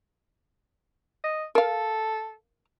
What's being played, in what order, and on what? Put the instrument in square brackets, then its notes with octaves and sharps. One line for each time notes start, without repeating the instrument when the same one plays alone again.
[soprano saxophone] D#5
[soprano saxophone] A4 [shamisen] A#4 F5